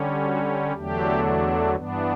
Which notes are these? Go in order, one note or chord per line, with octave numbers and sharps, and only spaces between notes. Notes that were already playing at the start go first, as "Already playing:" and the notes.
Already playing: D3 G3 C#4
F#4
E2 D3 F#3 A3 D4 G4
G2 E3 B3 D4